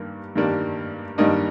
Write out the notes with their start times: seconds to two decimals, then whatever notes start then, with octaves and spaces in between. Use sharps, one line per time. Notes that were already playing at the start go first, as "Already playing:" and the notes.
Already playing: G2 D#3 G3 A#3 D4
0.36 G2 D#3 G3 A#3 D4
1.18 G2 D#3 G3 A#3 D4 D#5